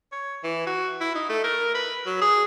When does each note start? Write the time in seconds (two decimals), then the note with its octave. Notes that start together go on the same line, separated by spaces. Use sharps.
0.12 C#5
0.44 E3
0.67 F#4
1.01 E4
1.15 D#4
1.29 A3
1.44 A#4
1.75 B4
2.06 F#3
2.22 G#4